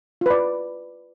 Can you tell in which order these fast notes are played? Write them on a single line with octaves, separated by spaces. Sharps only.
F4 B4 D5